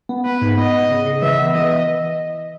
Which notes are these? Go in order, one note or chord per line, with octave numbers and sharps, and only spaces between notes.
B3
B3 B4
G#2
B3 D#5
B3
C#3
C#3
E3 E5
B3
E3 D#5